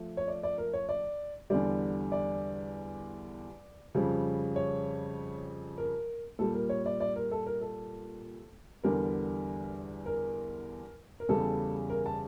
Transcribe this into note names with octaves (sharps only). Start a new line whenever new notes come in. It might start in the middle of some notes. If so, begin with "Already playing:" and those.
Already playing: F3 A3
C#5
D5
D5
A#4
C#5
D5
E2 D3 G3 D5
D5
F2 C#3 G3
C#5
A#4
A#2 G3 A4
A#4
C#5
D5
D5
A#4
A4
A#4
A4
E2 D3 G3 A#4
A#4
A#4
E2 C#3 G3 A4
A#4
A5